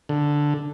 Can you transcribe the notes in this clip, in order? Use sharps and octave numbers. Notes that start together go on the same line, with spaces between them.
D3